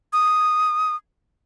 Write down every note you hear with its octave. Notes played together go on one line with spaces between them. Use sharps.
D#6